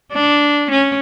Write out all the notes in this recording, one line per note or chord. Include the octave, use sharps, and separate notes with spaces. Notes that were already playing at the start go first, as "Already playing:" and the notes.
D4
C#4